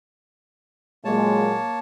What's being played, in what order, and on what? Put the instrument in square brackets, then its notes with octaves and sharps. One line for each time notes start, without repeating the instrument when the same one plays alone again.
[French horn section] A#2 F#3 G#3 [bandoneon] A#3 C#5 A5